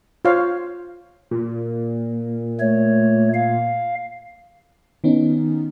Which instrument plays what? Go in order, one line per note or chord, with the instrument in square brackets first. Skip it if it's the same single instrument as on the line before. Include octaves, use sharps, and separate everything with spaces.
[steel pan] F4 C5 C#5 F5
[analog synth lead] A#2
[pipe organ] A3 C#5
F5
[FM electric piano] D#3 B3 C#4 D#4